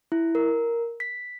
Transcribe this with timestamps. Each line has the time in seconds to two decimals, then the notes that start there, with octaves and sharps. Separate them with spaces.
0.12 E4
0.35 A#4
1.00 B6